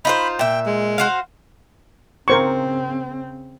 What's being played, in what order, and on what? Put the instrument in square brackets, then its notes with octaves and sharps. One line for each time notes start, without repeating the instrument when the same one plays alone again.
[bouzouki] D#4 F4 C5 [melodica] B5
[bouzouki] A#2 E5 [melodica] G5
[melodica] G#3
[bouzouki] F#4 C5 F5
[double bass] C#3 C4 [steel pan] A#4 C5 C#6